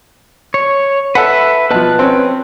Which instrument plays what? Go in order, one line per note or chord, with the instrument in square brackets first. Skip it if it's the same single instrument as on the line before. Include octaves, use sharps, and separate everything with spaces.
[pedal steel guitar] C#5
[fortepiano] A4 F#5 [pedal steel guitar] B4 E5
[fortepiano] B2 F3 [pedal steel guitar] B4 A5 F#6
[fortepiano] C4 C#4